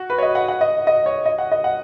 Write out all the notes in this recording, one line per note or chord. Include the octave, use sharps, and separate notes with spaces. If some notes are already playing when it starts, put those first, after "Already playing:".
Already playing: F#4
B4
C#5
D#5
F#5
F#5
D#5
D#5
C#5
D#5
F#5
D#5
F#5